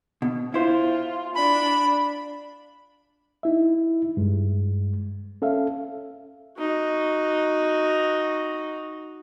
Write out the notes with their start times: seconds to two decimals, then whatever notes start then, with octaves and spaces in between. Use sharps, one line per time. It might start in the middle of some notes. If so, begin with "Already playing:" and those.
0.22 B2
0.54 E4 F4 C5
1.35 D4 B5
3.43 D#4 E4 E5
4.17 G2 G#3
5.42 C#4 A4 E5 F5
6.58 D#4 F#4